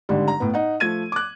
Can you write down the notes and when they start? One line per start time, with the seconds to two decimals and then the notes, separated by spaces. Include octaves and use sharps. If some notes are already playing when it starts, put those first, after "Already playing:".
0.09 G#1 D3 G3
0.28 A#5
0.40 A2 B3
0.54 D#4 F#5
0.80 F3 A3 G#6 D#7
1.12 D6 F#6